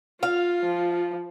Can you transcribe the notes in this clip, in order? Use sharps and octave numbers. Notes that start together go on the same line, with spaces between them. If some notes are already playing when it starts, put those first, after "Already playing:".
F4 F5
F3